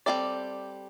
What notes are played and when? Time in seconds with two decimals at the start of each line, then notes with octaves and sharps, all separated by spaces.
0.06 G3 C4 E4 A4 D5